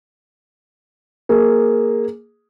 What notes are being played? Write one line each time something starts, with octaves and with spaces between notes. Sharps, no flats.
A#3 G#4